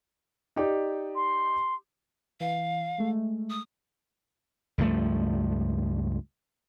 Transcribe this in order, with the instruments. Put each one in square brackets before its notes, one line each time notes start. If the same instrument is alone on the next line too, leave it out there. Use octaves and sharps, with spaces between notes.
[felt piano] D#4 G4 D5
[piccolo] C6
[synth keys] E3 [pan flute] F5
[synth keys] G#3 A3
[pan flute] D#6
[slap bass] C#2 G2 F3 A3